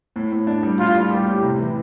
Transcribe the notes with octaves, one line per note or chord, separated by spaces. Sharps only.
A2
A2
D4
G3
A2 F4
G3
G3 G4
A2
C3
E3